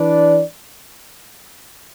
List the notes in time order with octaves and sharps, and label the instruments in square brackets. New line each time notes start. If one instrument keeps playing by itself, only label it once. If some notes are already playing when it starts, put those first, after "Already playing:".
Already playing: [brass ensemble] E3 D4 B4 D5